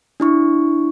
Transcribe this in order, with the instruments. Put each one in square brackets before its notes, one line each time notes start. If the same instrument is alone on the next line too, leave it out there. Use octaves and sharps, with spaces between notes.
[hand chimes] D4 E4 C#6